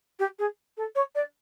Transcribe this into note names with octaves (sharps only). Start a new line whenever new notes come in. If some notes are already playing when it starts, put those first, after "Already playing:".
G4
G#4
A4
C#5
D5